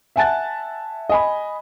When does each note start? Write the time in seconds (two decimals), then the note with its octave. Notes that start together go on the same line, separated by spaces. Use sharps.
0.16 E5 F#5 G#5 A5 F#6 A6
1.09 D#5 G#5 B5